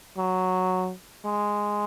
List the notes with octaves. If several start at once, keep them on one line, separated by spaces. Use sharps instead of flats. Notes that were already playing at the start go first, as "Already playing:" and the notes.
F#3
G#3